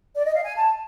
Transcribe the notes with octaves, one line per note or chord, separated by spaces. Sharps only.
D5
D#5
F5
G#5
A5